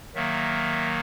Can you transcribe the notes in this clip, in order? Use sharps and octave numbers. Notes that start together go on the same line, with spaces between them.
D#3 F#3 A#3 E5